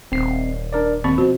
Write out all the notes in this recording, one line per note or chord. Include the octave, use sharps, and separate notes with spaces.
D#1 C4 C7
D4 A#4 D5
D#2 C4 B5 C#6
B2 F3 F#4